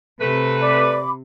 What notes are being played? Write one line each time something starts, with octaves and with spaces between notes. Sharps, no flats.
C3 A3 B4
D5 B5 D6